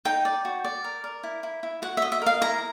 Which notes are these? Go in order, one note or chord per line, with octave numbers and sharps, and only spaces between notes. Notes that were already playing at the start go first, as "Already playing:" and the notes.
D#4 G5
D5
F#4
D5
A#4
A#4
E4
E4
E4
F#4 F#5
E5
D#5
E5
A#4 F5
E4 A#5